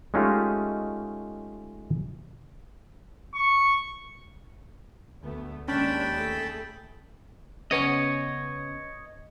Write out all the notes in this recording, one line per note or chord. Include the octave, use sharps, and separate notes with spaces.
G#3 A3 C#4 D#4 F4 G4
C#6
D2 A3 B3
D#2 G#3 C#4 D4 G5 A5 B5
A3 G#4
C#3 B3 C#4 C#5 D#5